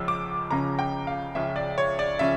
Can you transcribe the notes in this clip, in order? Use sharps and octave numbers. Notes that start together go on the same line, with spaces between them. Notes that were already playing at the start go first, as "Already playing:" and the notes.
Already playing: C#2 C#3 F3 C#4 E6
D6
C#2 C#3 F3 C#4 A#5
G5
F5
C#2 C#3 F3 C#4 E5
D5
C#5
D5
C#3 F3 C#4 E5